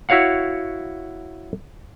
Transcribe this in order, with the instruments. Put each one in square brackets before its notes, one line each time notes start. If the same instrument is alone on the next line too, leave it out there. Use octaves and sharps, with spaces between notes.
[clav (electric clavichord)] E4 F#4 C#5 F5 F#5